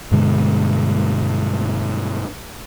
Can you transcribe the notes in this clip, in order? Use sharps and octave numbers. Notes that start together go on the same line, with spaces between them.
G2 B2 D3 G#3